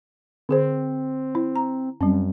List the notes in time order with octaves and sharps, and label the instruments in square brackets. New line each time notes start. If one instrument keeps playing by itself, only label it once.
[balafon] D3 G#4 C5 [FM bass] C4
[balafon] E4
A#5
[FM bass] F#2 [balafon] G3 C4 C#4